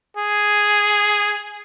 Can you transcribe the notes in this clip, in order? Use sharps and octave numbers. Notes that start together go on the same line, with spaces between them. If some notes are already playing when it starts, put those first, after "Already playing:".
G#4